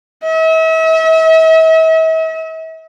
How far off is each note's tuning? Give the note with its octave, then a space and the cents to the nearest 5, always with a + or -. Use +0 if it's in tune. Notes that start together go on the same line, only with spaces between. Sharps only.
E5 -40